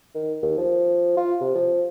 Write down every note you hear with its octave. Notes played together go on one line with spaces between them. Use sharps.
D#3
D#2
F3
F4
C3
F3